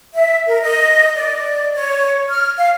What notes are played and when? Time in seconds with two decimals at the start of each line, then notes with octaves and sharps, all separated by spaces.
0.14 E5
0.47 A#4
0.62 D#5
1.15 D5
1.74 C#5
2.29 F6
2.57 F5